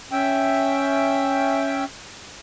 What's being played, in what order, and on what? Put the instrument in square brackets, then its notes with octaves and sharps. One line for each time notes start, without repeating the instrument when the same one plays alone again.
[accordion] C#4 E5 G5